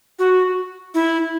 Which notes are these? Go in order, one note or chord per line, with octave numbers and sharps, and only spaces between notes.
F#4
E4